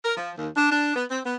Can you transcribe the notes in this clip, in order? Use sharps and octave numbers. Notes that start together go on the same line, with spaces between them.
A#4
F3
D#2
D4
D4
B3
C4
B3